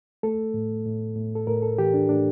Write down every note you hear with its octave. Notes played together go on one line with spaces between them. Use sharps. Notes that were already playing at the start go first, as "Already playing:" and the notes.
A3 A4
A2
A2
A2
A4
A2 A#4
A4
E3 G4
D4
A2 D4